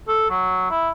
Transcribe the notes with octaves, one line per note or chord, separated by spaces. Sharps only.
A4
F#3
E4